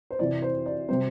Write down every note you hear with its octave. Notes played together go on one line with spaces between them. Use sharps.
C5
C3 E3 C4 D5
C5
D5
C3 G3 C4 C5